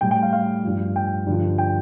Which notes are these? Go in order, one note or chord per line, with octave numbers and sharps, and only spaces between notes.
A2 G3 G5
G5
F5
F5
G2 F3
G5
G2 D3 F3
G5